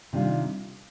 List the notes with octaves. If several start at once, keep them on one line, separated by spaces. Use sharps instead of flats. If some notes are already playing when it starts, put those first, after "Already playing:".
C3 D#3 G3 D4 F4